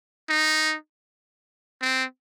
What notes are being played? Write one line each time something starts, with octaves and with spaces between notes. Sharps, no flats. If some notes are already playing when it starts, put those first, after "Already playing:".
D#4
C4